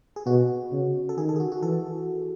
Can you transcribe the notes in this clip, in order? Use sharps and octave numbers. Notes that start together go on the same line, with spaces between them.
G#4
B2 F#4
C#3
A4
D#3 G#4
A4
G#4
F#4
F#4
E3 A4